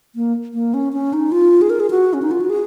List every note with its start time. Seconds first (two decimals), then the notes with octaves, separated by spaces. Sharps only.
0.15 A#3
0.54 A#3
0.74 C#4
0.93 C#4
1.13 D#4
1.32 F4
1.62 G#4
1.70 A#4
1.80 G#4
1.91 F#4
2.13 C#4
2.22 D#4
2.31 F4
2.41 F#4
2.50 G#4